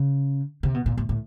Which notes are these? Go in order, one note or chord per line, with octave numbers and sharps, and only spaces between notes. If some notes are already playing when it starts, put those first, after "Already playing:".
Already playing: C#3
C3
B2
A#2
A2
A2